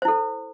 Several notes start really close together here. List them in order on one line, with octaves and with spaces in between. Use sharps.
C5 E4 A4